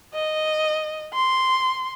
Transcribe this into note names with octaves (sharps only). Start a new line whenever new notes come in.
D#5
C6